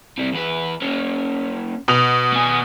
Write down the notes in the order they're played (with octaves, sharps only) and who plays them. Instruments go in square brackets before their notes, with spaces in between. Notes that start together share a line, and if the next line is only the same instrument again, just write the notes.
[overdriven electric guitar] C3 G3
E2 B4
A#3 C#4
[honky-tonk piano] B2 F7
[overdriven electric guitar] B3 G#5